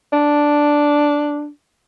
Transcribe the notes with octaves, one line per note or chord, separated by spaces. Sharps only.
D4